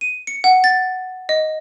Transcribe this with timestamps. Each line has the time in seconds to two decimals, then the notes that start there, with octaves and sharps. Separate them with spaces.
0.01 D#7
0.27 C#7
0.44 F#5
0.64 A6
1.29 D#5